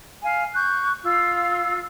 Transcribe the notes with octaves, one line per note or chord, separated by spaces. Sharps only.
F5 G#5
C#6 F#6 G6
F4 F5 E6